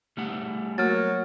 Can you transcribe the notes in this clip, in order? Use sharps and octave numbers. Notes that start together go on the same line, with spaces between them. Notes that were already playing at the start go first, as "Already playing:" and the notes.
G3 A3 F#5
F#3 A#3 F6 A6